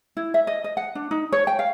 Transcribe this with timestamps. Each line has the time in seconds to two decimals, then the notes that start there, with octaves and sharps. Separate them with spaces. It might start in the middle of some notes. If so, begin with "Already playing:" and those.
0.17 E4
0.34 E5
0.47 D#5
0.64 D#5
0.77 F#5
0.95 D4
1.11 D#4
1.32 C#5
1.47 G5
1.59 F5